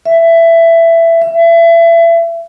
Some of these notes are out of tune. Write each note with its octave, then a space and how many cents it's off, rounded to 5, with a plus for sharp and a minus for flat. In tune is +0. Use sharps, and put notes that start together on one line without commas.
E5 +15
E5 +30